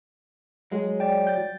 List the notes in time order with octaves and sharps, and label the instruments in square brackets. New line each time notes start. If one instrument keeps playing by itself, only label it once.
[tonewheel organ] F#3 [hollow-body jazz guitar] G#3
[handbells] D5 G5
G6 A6